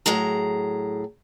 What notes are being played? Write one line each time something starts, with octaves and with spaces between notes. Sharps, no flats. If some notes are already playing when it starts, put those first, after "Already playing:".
A2 F#3 G#4 A#5